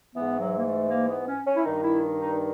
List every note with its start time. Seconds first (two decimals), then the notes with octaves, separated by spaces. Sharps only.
0.15 G#2 E3 B3
0.40 F#3
0.58 A#3
0.65 A3
0.90 A#3
1.09 B3
1.27 C#4
1.46 C#4
1.56 E4
1.65 G2 D#3 D#4
1.84 E4
2.21 D#4